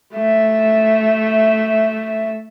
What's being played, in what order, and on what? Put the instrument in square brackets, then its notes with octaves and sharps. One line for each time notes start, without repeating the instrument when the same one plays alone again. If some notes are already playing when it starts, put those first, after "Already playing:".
[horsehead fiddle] A3 E5